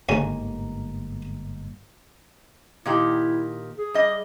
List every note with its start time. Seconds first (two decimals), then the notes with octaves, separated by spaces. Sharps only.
0.09 G1 D2 G#2 C#3 A#3 C#4
2.86 A#2 D#3 E4 G4
3.78 G#4
3.94 G3 D#5